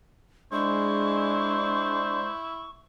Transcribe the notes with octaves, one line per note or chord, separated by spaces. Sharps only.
G#3 D4 E4 C5 C#6